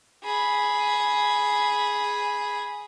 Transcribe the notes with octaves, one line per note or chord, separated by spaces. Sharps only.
G#4 B5